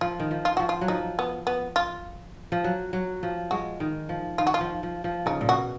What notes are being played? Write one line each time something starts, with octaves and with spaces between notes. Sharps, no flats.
F3 F4
D#3
F3
F4
F3 F#4
F4
F#3
F3 D#4
B3
B3
F4
F3
F#3
F#3
F3
G#3 F#4
D#3
F3
D#3 F4
F#4
F4
F3
F3
F3
C#3 D#4
A#2
B2 F#4